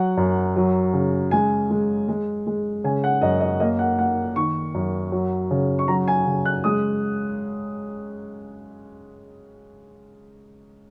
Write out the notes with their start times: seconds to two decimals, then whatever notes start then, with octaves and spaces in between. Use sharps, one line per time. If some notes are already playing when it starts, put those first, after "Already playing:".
Already playing: F#3 F#5
0.17 F#2
0.56 F#3
0.93 C#3
1.31 G#3 G#5
1.71 G#3
2.08 G#3
2.47 G#3
2.84 C#3 G#5
3.04 F#5
3.22 F#2 D#5
3.41 D#5
3.60 A#3 D#5
3.79 F#5
3.99 A#3 F#5
4.36 D#3 C#6
4.74 F#2
5.12 F#3
5.51 C#3
5.79 C#6
5.88 F#3 A#5
6.08 G#5
6.26 C#3
6.46 F#6
6.64 G#3 D#6